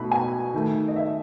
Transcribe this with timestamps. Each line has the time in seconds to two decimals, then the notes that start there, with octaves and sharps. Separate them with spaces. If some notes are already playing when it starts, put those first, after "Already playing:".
Already playing: B2 A3 B5
0.11 G#5
0.54 D#3 A3
0.88 D#5
0.96 E5